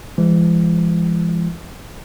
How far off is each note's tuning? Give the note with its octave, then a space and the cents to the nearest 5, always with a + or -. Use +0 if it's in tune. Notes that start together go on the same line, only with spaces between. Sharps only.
E3 +45 G#3 -20